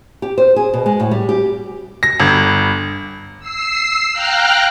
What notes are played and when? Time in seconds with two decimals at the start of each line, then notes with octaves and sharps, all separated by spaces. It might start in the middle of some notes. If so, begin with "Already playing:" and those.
0.22 G4
0.38 C5
0.56 G#4
0.74 B2
0.86 G#3
1.00 A2
1.11 G3
1.29 G4
2.03 A#6
2.20 G1
3.40 E6 C7
4.12 F5 G5 A#5 F6 F#6